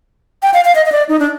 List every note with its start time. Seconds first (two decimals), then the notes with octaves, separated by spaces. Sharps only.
0.43 G5
0.54 F5
0.65 F5
0.75 D#5
0.86 D#5
0.92 D5
1.09 D#4
1.20 D4